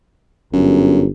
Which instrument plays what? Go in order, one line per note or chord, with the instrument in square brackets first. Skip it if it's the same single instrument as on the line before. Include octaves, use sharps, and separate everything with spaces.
[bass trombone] G1 [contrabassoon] F#2